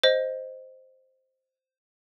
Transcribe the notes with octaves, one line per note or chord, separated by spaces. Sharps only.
C5 D#5